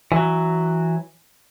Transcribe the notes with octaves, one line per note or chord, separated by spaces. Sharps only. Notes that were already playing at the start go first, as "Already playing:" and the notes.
E3 F#3